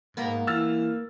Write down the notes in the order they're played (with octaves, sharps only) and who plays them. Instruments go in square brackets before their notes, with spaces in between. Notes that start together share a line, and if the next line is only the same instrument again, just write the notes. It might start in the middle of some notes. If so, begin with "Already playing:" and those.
[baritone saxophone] G#2 [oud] A#3 B3
[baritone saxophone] E3 [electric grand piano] E6 F6 A6